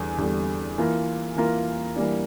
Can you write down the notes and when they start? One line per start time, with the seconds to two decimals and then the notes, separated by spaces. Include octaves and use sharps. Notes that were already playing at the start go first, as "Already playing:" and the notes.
Already playing: E2 D3 G3
0.18 E2 D3 G3
0.78 E3 A#3 F4 A#4
1.36 E3 A#3 F4 A#4
1.96 E3 G3 A#3 D4